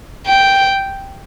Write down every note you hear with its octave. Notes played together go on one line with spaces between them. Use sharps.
G5